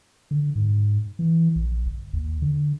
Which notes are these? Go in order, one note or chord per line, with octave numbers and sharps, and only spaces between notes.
D3
G#2
E3
A#1
G1
D#2
D3